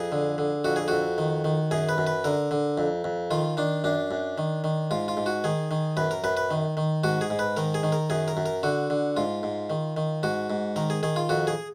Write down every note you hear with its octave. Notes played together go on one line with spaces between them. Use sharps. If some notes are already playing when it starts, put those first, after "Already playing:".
Already playing: F2 G#4
D3
D3
F2 F#4
G#4
F2 F#4
D#3
D#3
F#2 G#4
B4
F#2
B4
D3 A#4
D3
F2
F2
D#3 F4
D#3 D4
F#2 D4
F#2
D#3
D#3
G#2 F4
F4
G#2
F#4
D#3 G#4
D#3
F#2 B4
A#4
F#2 B4
B4
D#3
D#3
G#2 F#4
G#4
G#2
B4
D#3 A#4
G#4
D#3
A#4
F#2 G#4
A#4
F#2
A#4
D3 F#4
D3
G#2 F4
G#2
D#3
D#3
G#2 F#4
G#2
D#3 A#4
G#4
D#3 G#4
F4
F2 F#4
G#4